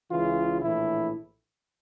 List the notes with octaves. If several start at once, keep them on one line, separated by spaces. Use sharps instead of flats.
C#2 C#3 E3 F4
A#1 A2 E3 E4